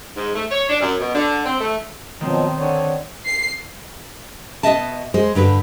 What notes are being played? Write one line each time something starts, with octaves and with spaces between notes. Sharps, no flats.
G#2
A3
C#5
D4
F#2
B2
D3
C4
A3
B2 D#3 F3 F#3 C4
D3 C#5
C7
B2 A3 B3 D#5 E5 A5
G#3 C5
G2 D3 A#4 B4